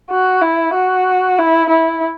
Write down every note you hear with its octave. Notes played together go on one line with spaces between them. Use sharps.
F#4
E4
F#4
E4
E4